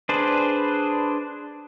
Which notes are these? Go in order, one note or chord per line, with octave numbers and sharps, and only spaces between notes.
D4 G#4 B4 C5 D5